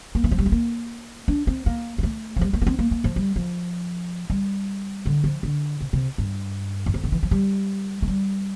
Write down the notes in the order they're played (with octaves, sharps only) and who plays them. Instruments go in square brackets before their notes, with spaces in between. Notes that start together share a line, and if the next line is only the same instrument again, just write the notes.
[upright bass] A#3
E3
F3
G3
A3
A#3
D4
C4
A#3
A#3
A3
F3
G3
A3
A#3
C4
A#3
A#3
F3
G3
F3
G3
D3
F3
D3
C3
C3
G2
E2
F2
D3
E3
F3
G3
A3
G3